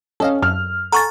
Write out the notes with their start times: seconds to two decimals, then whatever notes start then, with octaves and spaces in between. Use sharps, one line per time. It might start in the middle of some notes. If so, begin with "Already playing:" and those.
0.20 C#4 A4 D#5 F5
0.43 F#2 F6
0.92 A4 F#5 G#5 A#5 C#6 A6